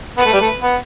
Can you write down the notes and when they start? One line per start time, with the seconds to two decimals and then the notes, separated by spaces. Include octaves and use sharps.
0.17 B3 B4
0.26 A3
0.33 G3
0.40 A3
0.62 B3